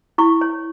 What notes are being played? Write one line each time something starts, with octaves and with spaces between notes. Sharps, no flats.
E4 C#6
C#5